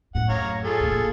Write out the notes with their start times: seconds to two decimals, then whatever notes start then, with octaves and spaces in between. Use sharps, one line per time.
0.15 F#2 A2 F#5
0.29 C#5 F5 A#5
0.65 F4 G#4 A4
0.80 D2 A#2
0.92 A#2